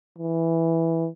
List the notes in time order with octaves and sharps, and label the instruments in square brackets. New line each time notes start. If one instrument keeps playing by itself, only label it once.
[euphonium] E3